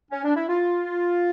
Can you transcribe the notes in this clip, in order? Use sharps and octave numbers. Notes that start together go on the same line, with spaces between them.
C#4
D4
E4
F4